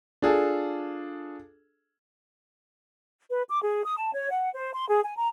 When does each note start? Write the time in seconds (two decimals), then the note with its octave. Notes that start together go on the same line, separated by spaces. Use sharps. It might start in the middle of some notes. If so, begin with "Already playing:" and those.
0.22 D4 F4 G#4 A4
3.30 B4
3.50 D6
3.62 G#4
3.85 D#6
3.97 A5
4.14 C#5
4.30 F#5
4.53 C5
4.74 C6
4.89 G#4
5.04 G#5
5.17 A#5